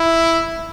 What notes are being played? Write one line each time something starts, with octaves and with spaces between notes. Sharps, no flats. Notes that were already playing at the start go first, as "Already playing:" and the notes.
Already playing: E4